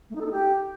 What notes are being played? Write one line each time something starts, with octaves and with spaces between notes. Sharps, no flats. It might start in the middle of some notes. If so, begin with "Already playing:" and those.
A3
D#4
A4
D#4
G4